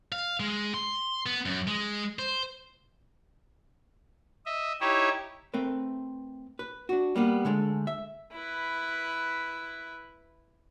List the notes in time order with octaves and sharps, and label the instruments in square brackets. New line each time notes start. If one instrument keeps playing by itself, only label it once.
[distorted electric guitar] F5
G#3
C6
B3
F#2
G#3
C5
[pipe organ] D#5 E5
D#4 E4 G4 C#5 E5
[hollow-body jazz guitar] A3 C4 A#4 B4
B4
D4 F#4
G3 A#3 B3
D3 G#3 A3
E5
[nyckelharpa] E4 B4